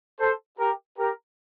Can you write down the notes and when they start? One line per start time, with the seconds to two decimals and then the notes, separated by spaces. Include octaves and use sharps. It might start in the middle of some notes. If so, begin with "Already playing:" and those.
0.19 A4 C5
0.59 G4 A#4
0.98 G4 A#4